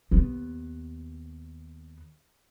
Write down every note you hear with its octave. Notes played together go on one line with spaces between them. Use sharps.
D#2 B3